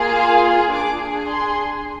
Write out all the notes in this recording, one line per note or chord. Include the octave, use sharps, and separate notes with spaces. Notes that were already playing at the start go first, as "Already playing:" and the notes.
Already playing: A#3 F4 G#4
F5
D4 G#4 D6
C6